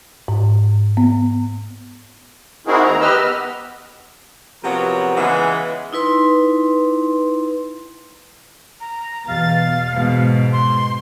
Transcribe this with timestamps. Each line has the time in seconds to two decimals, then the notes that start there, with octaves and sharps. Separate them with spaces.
0.28 G#2
0.97 B3
2.67 C4 D#4 E4 F#4 G#4 A#4
2.85 D#2 G#3 A#5
3.01 G4 B4 D#5 E6 F6
3.23 B3
4.64 C3 F3 F#3 B3 A#4
5.17 C#3 E3 G#3 B3 G#4
5.93 D#4 E4 B4 C6
8.80 A#5
9.28 E2 B2 F5 A6
9.94 G#2 B2
10.52 C6